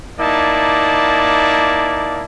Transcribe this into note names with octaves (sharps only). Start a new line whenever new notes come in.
A#3 D#4 E4 D5 A5